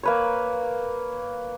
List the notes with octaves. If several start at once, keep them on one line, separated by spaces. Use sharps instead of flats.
A#3 B4 C#5